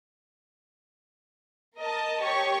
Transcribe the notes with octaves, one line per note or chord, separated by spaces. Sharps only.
A#4 D#5 A5
G4 C#5 C#6